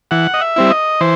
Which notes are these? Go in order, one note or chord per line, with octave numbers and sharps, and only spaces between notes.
E3 F#5
D#5
E5
G3 C4 E4
D#5
E3 C5